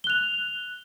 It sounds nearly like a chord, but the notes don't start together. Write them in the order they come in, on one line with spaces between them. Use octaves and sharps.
G7 F#6 F7